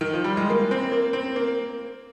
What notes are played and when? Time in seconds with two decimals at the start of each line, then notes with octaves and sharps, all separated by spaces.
0.01 D#3
0.13 F3
0.24 G3
0.37 G#3
0.50 A#3
0.71 C4
0.92 A#3
1.13 C4
1.36 A#3